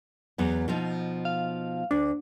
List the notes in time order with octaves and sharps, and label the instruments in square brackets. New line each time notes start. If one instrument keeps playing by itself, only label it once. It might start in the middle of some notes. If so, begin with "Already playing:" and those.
[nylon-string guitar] E2 F#3 B3
B2 F3 D#4
[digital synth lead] F5
[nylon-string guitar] D2 [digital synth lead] D4